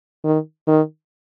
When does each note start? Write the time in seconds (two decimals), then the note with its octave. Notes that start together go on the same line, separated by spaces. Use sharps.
0.25 D#3
0.68 D#3